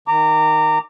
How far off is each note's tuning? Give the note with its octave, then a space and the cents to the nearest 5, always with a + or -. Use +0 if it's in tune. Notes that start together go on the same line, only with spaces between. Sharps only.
D#3 +0 A#5 -25 D6 +0